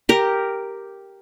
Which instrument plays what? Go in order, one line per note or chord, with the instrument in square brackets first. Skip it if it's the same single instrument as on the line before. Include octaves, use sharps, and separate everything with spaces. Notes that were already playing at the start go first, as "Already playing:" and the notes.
[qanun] G4 A#4